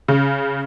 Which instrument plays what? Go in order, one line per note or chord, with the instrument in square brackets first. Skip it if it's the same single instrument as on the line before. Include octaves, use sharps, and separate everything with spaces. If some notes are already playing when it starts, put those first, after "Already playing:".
[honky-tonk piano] C#3